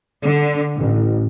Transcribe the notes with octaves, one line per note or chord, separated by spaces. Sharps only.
D3
A1